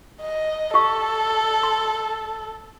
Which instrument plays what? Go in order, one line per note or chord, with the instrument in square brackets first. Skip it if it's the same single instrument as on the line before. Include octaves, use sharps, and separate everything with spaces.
[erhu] D#5
[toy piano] G4 F5 C#6 [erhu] A4
[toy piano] C6